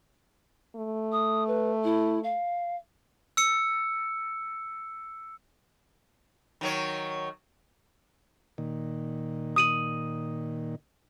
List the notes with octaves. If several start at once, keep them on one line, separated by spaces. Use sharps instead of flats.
A3
D#6
B4
E4
F5
E6 C#7
D#3 F#3 C#5
A#2 D#3
D#6 D#7 F#7